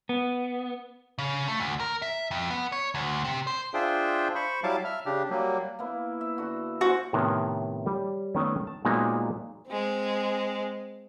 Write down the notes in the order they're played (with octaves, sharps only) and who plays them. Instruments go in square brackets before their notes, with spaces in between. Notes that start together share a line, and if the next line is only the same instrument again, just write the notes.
[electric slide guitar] B3
[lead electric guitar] C#3
A3
D2
A#4
E5
F2
B3
C#5
D2
C3
C5
[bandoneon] D4 F4 G#4 C5 E5 G5
C5 B5 C#6
F#3 G3 E4 F5 A5 D6
E5 F6
C#3 D4 G4
F#3 G3 A#3
[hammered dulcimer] A#3 B3 E4
E5
D3 F#4
[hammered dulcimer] C#4 C5 [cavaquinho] F#4
[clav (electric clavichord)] A2 C3 D#3 B3 A#4 C#5
G3 C#5
D#3 A3 B3 C#4
A5
A#2 F#3 G#3 A#3 B3 D#4
[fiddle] G#3 C4